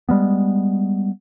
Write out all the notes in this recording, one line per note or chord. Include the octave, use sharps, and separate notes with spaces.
G3 G#3 B3